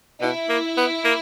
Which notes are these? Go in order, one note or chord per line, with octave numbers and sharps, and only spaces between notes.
B2 E4
A#3
B3
A#3